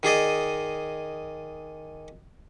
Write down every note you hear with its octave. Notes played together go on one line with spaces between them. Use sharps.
D#3 G#4 D5 D#5